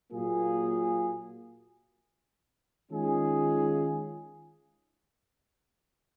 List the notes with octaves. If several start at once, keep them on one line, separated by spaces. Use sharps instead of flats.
A#2 F#3 A#3 F4 G#4
D#3 G#3 C#4 F4 G#4